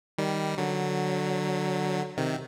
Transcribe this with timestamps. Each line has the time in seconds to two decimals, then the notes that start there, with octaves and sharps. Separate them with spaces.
0.18 D#3 G3
0.58 D3 F#3
2.17 C3 D#3